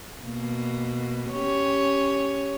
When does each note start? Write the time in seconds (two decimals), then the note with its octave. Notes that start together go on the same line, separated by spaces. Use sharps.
0.22 B2 A#3
1.31 C#4 G4 C#5